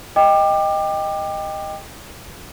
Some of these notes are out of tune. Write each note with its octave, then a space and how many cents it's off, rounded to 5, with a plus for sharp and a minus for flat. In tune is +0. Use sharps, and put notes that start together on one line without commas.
D#5 +0 G5 +10 D6 +30